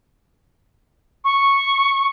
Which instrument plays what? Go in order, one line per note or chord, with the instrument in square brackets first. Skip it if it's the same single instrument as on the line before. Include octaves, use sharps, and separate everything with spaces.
[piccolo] C#6